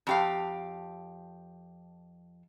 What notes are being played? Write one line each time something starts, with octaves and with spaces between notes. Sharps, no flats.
F2 G4 F5